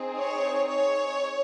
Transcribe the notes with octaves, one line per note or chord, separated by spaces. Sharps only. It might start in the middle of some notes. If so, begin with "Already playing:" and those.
Already playing: C4 D#4 G#4
C#5
C#5